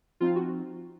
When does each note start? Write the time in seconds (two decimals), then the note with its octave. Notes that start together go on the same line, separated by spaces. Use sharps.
0.20 F3 C4 D#4 F4
0.35 F#4